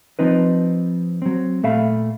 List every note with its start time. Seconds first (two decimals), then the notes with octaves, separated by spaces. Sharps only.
0.19 F3 C4 D#4 B4
1.22 F#3 C4
1.63 A#2 A3 E5 F5 B5